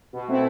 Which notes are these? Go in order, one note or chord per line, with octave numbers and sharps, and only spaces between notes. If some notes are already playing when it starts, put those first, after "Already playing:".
B2
A3 C4 E4